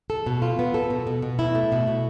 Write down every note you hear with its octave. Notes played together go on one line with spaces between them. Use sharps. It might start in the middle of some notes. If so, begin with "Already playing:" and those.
A4
B2
F4
B3
A4
B2
B2
B2
E4
A3
B2
B2